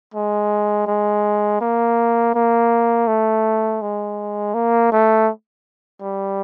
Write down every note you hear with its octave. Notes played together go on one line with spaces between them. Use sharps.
G#3
G#3
A#3
A#3
A3
G#3
A#3
A3
G3